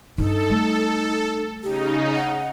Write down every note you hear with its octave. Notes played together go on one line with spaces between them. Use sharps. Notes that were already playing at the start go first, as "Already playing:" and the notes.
G2 D#4 F4 A4
G3 A3
C#3 D#4 G4
F#5